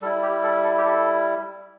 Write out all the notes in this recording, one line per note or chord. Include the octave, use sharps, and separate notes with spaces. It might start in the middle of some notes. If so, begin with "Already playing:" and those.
G3 E4 A4
G4
A4
A4
G4
A4